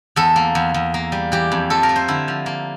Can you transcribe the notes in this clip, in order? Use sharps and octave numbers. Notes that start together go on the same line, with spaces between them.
E2 A4
A#3
E2
E2
A#3
G3
E3 G4
F2
F3 A4
A#4
A3
C5
D3 E4
F3
A#3